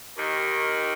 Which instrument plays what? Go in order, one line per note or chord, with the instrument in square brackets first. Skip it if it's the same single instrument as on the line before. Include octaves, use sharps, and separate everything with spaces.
[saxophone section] D#2 D#3